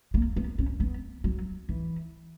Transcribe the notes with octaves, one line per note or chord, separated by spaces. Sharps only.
A#3
B3
C#4
B3
F#3
E3